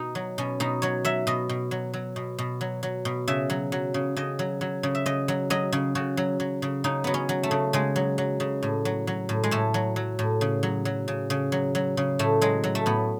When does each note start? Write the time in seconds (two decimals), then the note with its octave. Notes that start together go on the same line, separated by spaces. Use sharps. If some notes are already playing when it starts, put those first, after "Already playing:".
Already playing: B2 D#4
0.15 F#3
0.38 B2 C#4
0.60 B2 D#4
0.82 F#3 C#5
1.05 F#3 E5
1.27 B2 D#5
1.49 B2
1.71 F#3
1.94 F#3
2.16 B2
2.39 B2
2.61 F#3
2.83 F#3
3.05 B2
3.28 C#3 E5
3.50 F#3
3.72 F#3
3.94 C#3
4.16 C#3 D#5
4.39 F#3
4.61 F#3
4.83 C#3
4.95 E5
5.06 C#3 D#5
5.28 F#3
5.50 F#3 D#5
5.72 C#3
5.95 C#3 F#4
6.17 F#3
6.40 F#3
6.62 C#3
6.84 C#3 D#4
7.04 F#3 B3
7.14 C#4
7.29 F#3
7.43 A3
7.51 C#3
7.73 C#3 G#3
7.96 F#3
8.18 F#3
8.40 C#3
8.63 A2
8.85 F#3
9.07 F#3
9.29 A2
9.44 G#3
9.51 A2 A3
9.74 F#3
9.96 F#3
10.19 A2
10.41 C#3
10.63 F#3
10.85 F#3
11.08 C#3
11.30 C#3
11.52 F#3
11.75 F#3
11.97 C#3
12.19 A2 A3
12.41 F#3 G#3
12.64 F#3
12.75 A3
12.86 A2 B3